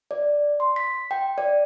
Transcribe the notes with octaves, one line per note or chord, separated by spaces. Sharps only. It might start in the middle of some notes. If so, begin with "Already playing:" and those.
D5
C6
B6
G5
D5